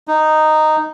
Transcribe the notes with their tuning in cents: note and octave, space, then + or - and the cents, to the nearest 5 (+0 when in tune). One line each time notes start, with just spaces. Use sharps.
D#4 -10